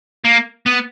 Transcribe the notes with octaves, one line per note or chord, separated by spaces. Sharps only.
A#3
B3